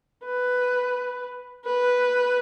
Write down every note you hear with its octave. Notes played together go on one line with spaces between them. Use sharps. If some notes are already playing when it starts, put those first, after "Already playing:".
B4
B4